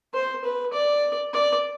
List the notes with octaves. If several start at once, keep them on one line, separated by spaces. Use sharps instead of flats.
C5
B4
D5
D5